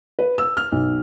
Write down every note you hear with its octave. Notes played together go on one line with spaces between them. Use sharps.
B4
E6
F6
B1